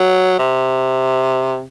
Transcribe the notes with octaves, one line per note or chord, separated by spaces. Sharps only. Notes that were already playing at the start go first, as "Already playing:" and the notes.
Already playing: F#3
C3